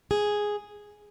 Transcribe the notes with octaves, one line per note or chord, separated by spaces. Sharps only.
G#4